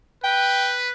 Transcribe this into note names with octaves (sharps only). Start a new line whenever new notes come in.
B4 G5